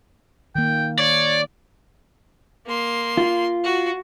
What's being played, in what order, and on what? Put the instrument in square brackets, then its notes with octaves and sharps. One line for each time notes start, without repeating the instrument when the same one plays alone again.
[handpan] D#3 A#3 [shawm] G5
[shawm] C#5 [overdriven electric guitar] D5
[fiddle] A#3 C6
[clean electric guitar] F4
[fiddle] F#4